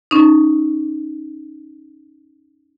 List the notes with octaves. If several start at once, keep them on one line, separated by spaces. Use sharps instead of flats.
C#4 D#4